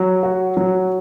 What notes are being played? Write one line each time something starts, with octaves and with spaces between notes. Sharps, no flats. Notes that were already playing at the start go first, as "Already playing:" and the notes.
Already playing: F#3
F#4
F#3